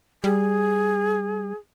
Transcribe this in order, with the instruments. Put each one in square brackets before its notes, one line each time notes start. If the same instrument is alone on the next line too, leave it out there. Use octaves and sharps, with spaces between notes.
[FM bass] G3 [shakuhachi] G#4